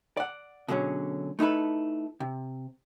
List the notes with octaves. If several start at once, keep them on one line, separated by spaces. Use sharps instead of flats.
D5 F#5
B2 D3 F#3 C#4 G#4
A3 D#4 E4 A4 B4
C3